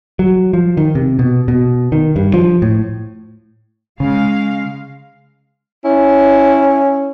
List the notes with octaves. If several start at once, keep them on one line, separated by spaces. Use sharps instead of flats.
F#3
F3
D#3
C3
B2
B2
D#3
G2
F3
A2
C#3 G#3 F5
C#4 E4